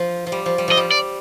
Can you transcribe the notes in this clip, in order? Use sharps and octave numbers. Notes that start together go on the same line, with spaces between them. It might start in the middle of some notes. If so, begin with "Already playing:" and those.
Already playing: F3
F3
G3
F3
G3
F3 D#5
G3
D5